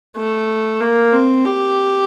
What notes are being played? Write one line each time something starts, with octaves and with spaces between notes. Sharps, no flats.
A3
A#3
C4
G4